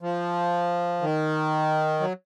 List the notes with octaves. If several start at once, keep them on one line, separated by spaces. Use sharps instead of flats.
F3
D#3
F#3